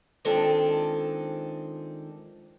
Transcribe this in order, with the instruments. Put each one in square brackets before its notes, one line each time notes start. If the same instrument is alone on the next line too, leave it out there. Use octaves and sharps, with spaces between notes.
[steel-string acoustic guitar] D#3 F3 G#3 C4 D4 A4